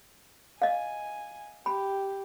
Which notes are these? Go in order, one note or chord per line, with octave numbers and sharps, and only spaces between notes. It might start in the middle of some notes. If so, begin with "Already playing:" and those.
D#5 F5 G#5
G4 B5